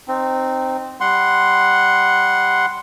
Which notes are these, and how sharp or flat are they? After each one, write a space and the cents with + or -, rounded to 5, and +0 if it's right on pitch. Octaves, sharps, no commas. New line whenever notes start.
C4 +0 D#4 -20
G3 +0 F#5 +0 C6 +0